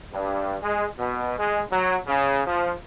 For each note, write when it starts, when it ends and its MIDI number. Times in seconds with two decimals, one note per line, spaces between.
0.14 0.55 43
0.62 0.86 56
0.97 1.33 47
1.38 1.61 56
1.72 1.97 54
2.07 2.41 49
2.47 2.71 53